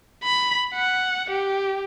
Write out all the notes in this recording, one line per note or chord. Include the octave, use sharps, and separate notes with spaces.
B5
F#5
G4